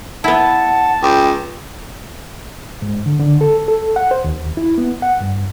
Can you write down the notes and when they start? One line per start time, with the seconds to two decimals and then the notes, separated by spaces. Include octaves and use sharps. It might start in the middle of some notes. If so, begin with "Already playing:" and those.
0.24 B3 E4 F#5 A5
1.02 C#2 G5
2.82 G#2
3.06 D3
3.19 D3
3.41 A4
3.68 A4
3.96 F#5
4.11 C5
4.24 D#2
4.57 E4
4.78 B3
5.02 F#5
5.21 G2